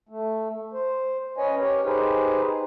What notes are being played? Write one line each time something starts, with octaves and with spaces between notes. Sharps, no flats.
A3
C5
C#4 B4 C#5 D#5 G#5
G4 A#4 C#5
D#4 G4 G#4 B4 C5